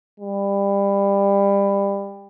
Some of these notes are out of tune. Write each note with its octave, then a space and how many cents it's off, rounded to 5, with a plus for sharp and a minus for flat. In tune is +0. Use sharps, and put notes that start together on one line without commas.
G3 +25